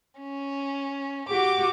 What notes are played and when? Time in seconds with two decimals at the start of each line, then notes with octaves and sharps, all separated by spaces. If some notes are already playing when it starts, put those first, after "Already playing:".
0.19 C#4
1.29 F#4 G4 D6